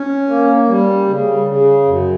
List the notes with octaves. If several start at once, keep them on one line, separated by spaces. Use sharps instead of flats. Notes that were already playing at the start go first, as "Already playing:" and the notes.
Already playing: C#4
A#3
G3
C#3
C#3
F#2